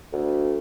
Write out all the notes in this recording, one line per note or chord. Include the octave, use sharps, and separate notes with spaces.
D2